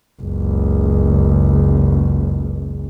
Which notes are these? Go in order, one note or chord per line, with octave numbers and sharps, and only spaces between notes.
F#1 C#2